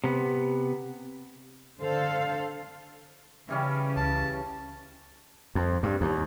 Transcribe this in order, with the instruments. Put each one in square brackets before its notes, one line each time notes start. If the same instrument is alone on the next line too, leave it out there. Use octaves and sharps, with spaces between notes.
[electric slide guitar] C3 B3
[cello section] D3 A4 C5 F5
[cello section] C#3 [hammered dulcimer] E3 G3 C#4
[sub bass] C#2 [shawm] A5
[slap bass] F2
G2
D#2